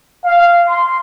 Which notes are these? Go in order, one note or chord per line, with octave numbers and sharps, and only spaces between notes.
F5
C6